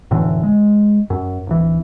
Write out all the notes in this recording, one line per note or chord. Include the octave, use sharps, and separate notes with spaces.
F1 A2 D3 E3
G#3
F#2
D1 E3